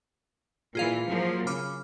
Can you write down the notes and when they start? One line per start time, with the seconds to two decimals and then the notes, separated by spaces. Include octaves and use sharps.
0.75 A#2 E3 F4 G#4 F5
1.08 F3 F#3 A#3
1.47 C#3 B5 D6 F6